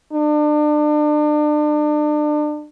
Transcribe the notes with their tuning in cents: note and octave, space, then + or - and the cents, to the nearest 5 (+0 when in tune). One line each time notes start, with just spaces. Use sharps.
D4 +35